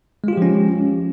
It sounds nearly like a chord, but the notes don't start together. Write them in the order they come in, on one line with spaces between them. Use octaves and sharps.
G#3 F4 G4 F3 C#4